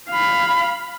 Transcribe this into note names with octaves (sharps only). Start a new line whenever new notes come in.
F5 B5